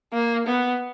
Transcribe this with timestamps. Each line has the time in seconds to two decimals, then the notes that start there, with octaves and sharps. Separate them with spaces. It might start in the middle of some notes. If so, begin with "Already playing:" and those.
0.13 A#3
0.46 B3